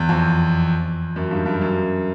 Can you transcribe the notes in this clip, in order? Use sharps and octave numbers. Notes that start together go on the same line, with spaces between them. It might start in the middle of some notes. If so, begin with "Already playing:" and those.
Already playing: E2
F2
F#2
G2
G2
F#2